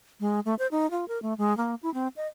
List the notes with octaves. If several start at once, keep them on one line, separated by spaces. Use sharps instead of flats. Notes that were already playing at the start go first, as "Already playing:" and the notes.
G#3
A3
C5
D#4
F4
A#4
A3
G#3
A#3
E4
C4
D#5